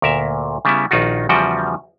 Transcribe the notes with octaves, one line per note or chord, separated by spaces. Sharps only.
D2 A#2 A#4 E5
C#3 G3 B3 E4
A#1 D#3 D#4 F4 F#4
E2 C#3 F3 G3 F#4 G5